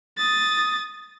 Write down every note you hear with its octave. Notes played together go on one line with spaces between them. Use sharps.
D#6 A6